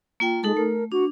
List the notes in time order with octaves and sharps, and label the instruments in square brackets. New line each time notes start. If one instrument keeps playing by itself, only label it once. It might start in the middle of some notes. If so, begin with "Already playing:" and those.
[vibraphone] A#3 F4 G5
[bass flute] G#3 [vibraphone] D#4 A4 A5
[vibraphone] A3 [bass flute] A#4
[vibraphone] D4 [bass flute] F#4